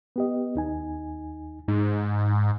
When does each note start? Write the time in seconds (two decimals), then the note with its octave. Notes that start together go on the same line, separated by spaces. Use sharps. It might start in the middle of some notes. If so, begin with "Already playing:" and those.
0.16 B3 G4 D#5
0.55 D#2 D#4 G#5
1.68 G#2 D#4